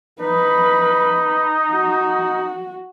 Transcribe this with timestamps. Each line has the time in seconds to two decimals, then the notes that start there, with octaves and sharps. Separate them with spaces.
0.20 D#4 B4 B5
1.72 F#4